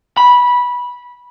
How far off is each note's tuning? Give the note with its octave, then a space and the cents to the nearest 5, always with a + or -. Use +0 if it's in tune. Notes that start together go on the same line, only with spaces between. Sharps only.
B5 -15